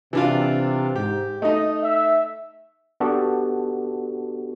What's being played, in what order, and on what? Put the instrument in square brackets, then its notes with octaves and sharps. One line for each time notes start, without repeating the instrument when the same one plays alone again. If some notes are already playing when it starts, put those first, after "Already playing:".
[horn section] C3 [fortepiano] E3 D4 F4
[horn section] G#2 [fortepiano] G4
[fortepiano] A3 D#4 [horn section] D#5
[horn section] E5
[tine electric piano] B3 D4 F#4 G4 A4